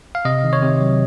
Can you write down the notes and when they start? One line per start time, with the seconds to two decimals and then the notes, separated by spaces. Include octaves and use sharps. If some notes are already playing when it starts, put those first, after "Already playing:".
0.15 F5
0.25 C3 D#5
0.44 D#3
0.53 C#5
0.62 C3
0.81 F#3